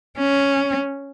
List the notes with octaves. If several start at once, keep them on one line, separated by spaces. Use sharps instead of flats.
C#4